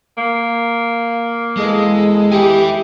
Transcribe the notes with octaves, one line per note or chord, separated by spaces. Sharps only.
A#3
E2 G#3 A4 D#5
E4 G4 G#5